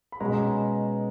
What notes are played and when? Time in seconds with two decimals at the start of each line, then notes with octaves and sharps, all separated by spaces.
0.12 B5
0.20 B2 G#3 C#4 A#5
0.32 A#5